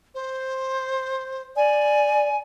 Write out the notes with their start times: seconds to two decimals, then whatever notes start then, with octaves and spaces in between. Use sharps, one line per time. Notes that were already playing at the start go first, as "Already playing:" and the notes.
0.14 C5
1.56 D5 G#5